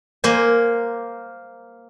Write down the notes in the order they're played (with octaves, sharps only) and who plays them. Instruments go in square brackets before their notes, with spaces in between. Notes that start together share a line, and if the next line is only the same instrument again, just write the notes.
[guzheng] A#3 A#4 C5 G#5